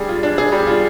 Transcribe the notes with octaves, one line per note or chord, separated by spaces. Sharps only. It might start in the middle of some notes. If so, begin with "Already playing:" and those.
Already playing: G3 D4 G#4
F4
D4
G#4
G3
F4